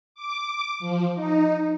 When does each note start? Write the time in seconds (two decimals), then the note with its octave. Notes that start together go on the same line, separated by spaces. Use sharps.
0.15 D6
0.80 F3
1.15 D#4